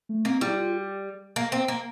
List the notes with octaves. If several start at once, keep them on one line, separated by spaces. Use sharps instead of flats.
A3
A#3 C4
G3 E4
F4
G4
A#3
C4
A#3